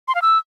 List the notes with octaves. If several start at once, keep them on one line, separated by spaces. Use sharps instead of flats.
C6
F5
E6